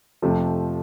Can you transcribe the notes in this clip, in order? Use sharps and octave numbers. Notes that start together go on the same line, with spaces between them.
F2 C3 F3 A3